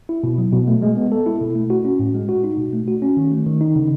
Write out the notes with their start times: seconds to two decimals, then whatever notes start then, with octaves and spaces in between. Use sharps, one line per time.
0.09 E4
0.23 B2
0.38 F#3
0.53 B2
0.68 A3
0.82 G#3
0.97 B3
1.12 A4
1.26 E4
1.41 B2
1.56 A3
1.70 F#4
1.85 C#4
1.99 A2
2.14 G#3
2.29 F#4
2.44 D#4
2.58 B2
2.73 A3
2.88 F#4
3.02 C#4
3.17 D#3
3.31 A3
3.46 D#3
3.61 D#4
3.76 C#3